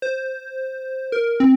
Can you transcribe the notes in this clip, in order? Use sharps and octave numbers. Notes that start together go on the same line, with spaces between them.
C5
A#4
C4